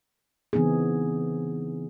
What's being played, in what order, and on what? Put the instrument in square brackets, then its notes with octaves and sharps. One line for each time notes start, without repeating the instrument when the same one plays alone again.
[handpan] C#3 E3 B3 C4 D#4 G#4